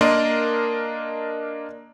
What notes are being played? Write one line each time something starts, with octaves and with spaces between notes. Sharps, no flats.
A#3 D4 A#4 D5 D#5 C6